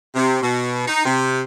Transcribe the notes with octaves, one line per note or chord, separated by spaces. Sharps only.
C3
B2
D#4
C3